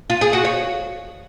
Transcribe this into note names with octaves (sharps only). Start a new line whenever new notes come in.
F4
G#4
F#4
C#5